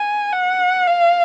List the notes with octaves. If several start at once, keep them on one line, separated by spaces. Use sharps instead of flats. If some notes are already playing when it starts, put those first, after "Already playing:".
Already playing: G#5
F#5
F5